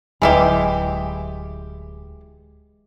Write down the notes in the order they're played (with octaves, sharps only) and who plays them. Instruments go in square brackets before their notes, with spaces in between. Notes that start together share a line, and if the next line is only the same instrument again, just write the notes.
[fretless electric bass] D1 [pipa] E3 E4 G4 [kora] G#3